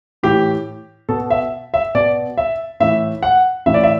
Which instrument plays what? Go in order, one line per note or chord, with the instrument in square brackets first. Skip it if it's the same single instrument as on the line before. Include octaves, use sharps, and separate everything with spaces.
[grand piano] A2 E3 G4
B2 A4
E5
E5
B2 D5
E5
A2 E3 E5
F#5
A2 E3 E5
D5
E5